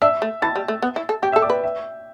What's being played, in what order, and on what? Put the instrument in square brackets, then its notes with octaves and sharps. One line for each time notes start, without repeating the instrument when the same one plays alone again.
[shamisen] D4 [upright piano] E5 E6
[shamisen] A3
[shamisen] E3 [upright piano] A5 A6
[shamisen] G3
A3
B3
E4
A4
[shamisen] G4 [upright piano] G5 G6
[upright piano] E5 E6
[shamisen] A4
[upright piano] D5 D6
[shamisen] B4
[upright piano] E5